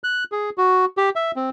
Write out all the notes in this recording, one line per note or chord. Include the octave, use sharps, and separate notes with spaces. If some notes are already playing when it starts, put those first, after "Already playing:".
F#6
G#4
F#4
G4
E5
C4